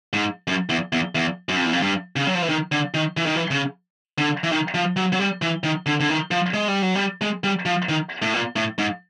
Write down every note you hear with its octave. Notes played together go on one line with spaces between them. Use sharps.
G#2
F#2
E2
E2
E2
F#2
F2
E2
F2
G2
C#3
F#3
F3
E3
D#3
D3
D#3
E3
D#3
E3
C#3
D3
E3
D#3
F3
F#3
F#3
G3
E3
D#3
D3
D3
D#3
F3
G#3
G3
F#3
G3
G#3
G3
F3
D#3
A2
A#2
A2
G#2